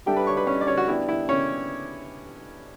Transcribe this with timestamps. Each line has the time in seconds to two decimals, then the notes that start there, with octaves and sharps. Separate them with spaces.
0.06 G3 D4 G4 A4 E5 G5
0.16 B4 B5
0.27 C#5 C#6
0.37 B4 B5
0.47 C#4 C#5
0.61 D5
0.67 C#4 C#5
0.78 F#4
0.88 B3 D4 E4 G4 D5
1.09 E4
1.29 C#4 C#5